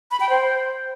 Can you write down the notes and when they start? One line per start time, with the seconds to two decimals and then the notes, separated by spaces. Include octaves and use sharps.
0.11 B5
0.20 G5
0.29 C5